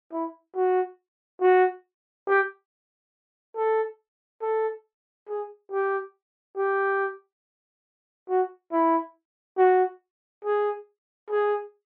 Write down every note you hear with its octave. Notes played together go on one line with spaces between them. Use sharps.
E4
F#4
F#4
G4
A4
A4
G#4
G4
G4
F#4
E4
F#4
G#4
G#4